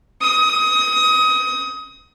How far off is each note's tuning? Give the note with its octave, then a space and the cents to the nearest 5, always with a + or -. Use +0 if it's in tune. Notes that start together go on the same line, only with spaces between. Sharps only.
D#6 +25